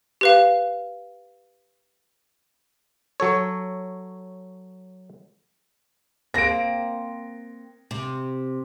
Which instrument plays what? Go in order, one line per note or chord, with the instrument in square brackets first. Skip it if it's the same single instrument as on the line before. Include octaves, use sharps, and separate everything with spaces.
[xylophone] G4 B4 F5
[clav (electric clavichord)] F#3 A4 C#5
[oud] A#3 C4 [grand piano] A#6 D7
[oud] C3